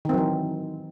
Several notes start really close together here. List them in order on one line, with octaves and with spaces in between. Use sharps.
D#3 C4 F#3 E3